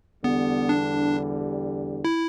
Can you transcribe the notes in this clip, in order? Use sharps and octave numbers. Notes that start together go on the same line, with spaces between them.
E2 D3 G3 B3
D4
E4